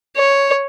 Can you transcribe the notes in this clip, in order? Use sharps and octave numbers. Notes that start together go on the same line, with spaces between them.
C#5